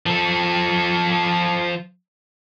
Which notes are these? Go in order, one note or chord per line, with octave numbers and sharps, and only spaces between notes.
F3 A4